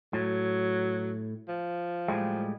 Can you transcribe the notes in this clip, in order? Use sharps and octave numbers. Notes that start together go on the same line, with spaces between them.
A2 F#3
F3
A2 G3 G#3